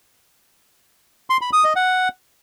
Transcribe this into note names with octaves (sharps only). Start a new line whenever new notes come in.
C6
B5
D#6
D#5
F#5